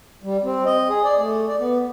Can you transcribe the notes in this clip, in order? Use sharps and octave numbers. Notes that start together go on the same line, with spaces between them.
G3
C4
D#5
G#4
D5
A3
D5
B3